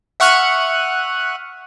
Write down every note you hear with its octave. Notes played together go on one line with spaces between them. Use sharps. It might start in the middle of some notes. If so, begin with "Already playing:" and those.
E5 F#5 C#6 F6 F#6 D#7